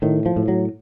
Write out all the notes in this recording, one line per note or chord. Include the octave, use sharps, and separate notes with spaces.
A2 D#3
F3
A2
F#3